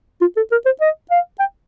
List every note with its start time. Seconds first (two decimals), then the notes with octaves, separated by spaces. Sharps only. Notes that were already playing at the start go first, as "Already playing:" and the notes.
0.21 F4
0.36 A4
0.52 A#4
0.65 C5
0.81 D#5
1.11 F5
1.40 G5